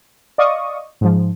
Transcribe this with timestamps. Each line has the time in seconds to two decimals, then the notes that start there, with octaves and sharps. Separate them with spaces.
0.38 D5 D#5 F5 C#6 D#6
1.01 G#2 F3